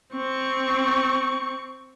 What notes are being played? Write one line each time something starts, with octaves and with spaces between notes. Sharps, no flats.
C4 C#6